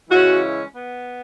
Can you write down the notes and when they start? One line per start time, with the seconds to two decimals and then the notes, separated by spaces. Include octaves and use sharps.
0.10 C#3 E3 G#3 C#4 E4 F#4
0.75 B3